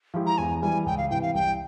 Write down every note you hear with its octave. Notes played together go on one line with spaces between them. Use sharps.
F3 G#3 E4 G4
A#5
E2 G#5
E3 G3 G#5
C#2 G5
F5
C3 E3 G5
F5
C2 G5